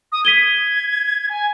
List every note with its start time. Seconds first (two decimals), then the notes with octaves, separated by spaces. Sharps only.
0.12 D#6
0.25 G#6 B6 D#7 G7
1.30 G#5